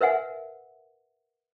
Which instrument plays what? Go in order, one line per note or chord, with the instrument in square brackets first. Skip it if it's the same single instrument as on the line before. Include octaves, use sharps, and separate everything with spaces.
[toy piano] A#4 B4 E5 F#5 G#5